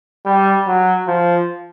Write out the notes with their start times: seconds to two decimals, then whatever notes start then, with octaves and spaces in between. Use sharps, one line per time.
0.25 G3
0.67 F#3
1.08 F3